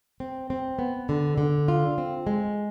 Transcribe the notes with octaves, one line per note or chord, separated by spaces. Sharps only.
C4
C4
B3
D3
D3
F4
C4
G#3